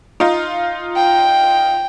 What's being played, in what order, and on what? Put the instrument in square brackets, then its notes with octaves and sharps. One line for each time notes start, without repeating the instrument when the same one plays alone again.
[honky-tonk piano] D#4 F4
[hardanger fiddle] G5